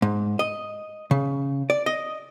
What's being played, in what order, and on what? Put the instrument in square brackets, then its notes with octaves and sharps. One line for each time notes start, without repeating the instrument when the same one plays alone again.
[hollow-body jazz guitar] G#2
D#5
C#3
D5
D#5